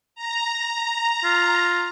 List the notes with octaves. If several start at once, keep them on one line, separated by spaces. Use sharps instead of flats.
A#5
F4